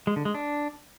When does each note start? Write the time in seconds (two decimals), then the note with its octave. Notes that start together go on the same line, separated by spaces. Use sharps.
0.07 G#3
0.16 D3
0.25 G#3
0.34 D4